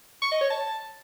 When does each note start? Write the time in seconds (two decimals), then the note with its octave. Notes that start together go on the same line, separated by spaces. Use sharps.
0.22 C#6
0.32 D#5
0.41 C#5
0.50 A5